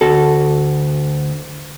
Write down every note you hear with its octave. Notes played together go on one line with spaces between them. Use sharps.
D2 F#4 A4